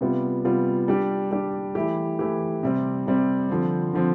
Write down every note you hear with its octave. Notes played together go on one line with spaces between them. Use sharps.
C3 G3 B3 F4
C3 G3 B3 F4
G3 D4 G4
G3 D4 G4
E3 A3 E4 G4
E3 A3 E4 G4
C3 G3 C4
C3 G3 C4
D3 F3 C4
D3 F3 C4